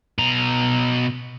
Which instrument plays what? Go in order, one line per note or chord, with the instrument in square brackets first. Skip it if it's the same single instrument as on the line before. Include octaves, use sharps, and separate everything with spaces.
[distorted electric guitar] B2 A#5